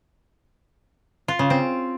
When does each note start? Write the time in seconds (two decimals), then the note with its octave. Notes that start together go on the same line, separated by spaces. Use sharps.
1.28 F4
1.39 C#3
1.50 C4